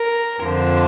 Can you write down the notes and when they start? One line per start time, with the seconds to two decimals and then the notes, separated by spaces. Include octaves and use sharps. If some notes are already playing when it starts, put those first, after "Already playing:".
Already playing: A#4
0.42 F2 D3 F3